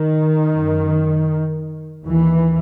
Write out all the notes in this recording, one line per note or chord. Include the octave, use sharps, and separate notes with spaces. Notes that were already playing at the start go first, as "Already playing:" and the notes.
Already playing: D#3
F#2
D#2 E3